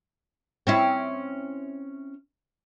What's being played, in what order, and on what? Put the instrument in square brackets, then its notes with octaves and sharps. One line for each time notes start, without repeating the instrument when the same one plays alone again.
[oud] C4 C#4 E4